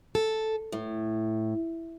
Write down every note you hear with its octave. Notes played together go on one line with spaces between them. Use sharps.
A4
A2